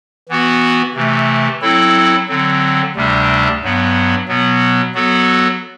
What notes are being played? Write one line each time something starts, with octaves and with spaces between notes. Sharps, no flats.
E3 B3 F#4
C3 E3 A3
F#3 C4 E4 A4
D3 F#3 C4
D2 C3 G3 D4
G2 F#3 B3
B2 F#3 B3
F#3 B3 F#4 A4